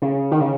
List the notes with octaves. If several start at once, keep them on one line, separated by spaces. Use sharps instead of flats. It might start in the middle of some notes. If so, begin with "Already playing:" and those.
C#3
D#3
C#3